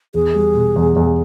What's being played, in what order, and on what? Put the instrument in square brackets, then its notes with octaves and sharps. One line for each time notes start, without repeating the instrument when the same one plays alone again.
[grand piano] E2 [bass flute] G#4
[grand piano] G3
B2
E2
E2